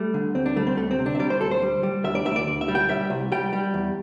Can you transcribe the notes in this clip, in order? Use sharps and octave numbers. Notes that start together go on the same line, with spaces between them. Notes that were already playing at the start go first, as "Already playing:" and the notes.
Already playing: G3 A3
D3
D2 C4
D4
G3 A3
C4
D2 A3
C4
C3
D4
E5
G3 D5
C5
D2 A4
C5
G3
G3
D2 E5
D5
D2 E5
D5
D2
E5
G3
G5
G3 E5
C2
G3 G5
G3
E2